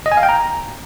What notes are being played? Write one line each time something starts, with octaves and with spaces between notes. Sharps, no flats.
D#5
G#5
F5
G5
A#5